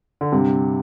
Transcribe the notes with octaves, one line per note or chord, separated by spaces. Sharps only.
D3
G2 C3